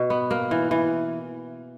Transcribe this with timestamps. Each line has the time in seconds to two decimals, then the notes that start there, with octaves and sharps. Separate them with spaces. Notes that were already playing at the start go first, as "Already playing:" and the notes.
Already playing: B2
0.10 B3
0.31 A#3
0.51 E3
0.71 E3